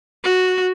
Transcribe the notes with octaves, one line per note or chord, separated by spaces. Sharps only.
F#4